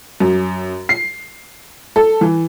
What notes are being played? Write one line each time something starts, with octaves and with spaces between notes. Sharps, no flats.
F#2
C7
A4
E3